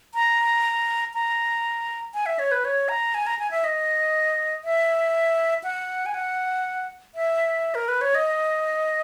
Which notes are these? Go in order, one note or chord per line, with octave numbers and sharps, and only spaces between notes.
A#5
A#5
G#5
E5
C#5
B4
C#5
A#5
G#5
A#5
G#5
E5
D#5
E5
F#5
G#5
F#5
E5
A#4
B4
C#5
D#5